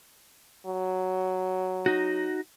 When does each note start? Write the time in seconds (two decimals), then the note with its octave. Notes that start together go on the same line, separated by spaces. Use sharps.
0.66 F#3
1.86 D#4 F#4